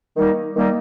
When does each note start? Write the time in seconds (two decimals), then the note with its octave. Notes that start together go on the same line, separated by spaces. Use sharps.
0.17 D#3 G3 A#3 D#4
0.56 D#3 G3 A#3 D#4